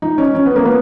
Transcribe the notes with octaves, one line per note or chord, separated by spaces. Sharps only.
D#4
C#4
C#4
B3
A#3
B3